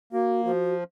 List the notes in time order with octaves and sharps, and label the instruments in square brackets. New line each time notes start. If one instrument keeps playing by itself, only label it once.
[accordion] A#3 [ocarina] F#4
[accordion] F3 [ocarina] F#4